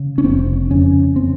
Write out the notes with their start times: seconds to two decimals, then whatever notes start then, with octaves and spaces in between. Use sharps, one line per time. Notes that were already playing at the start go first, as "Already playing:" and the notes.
Already playing: C#3
0.18 C#4
0.24 F1 C4
0.70 F2 C#3 C#4
1.16 C4